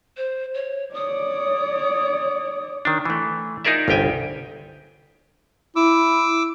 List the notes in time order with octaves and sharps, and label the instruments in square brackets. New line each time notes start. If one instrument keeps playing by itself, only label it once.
[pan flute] C5
C#5
[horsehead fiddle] C#5 D5 [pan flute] D#6
[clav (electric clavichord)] D#3 D4
E3 A3
D#4 F4 G#4 A#4 D5 E5
G1 C2 G4 G5 G#5
[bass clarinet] E4 [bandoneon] D6 E6